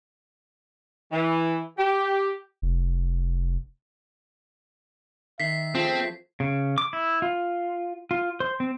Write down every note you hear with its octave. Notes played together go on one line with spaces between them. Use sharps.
E3
G4
F1
D#3 E5 B6 C7
F3 A3 C4 G#4
C#3
D6
E4
F4
F4
C5
C4